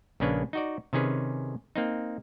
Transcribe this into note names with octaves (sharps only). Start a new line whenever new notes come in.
A#1 C#3 A#3 C#4 D4 B4
D#4 F#4 D5
C3 D#3 C#4 G#4 B4
A#3 C4 D#4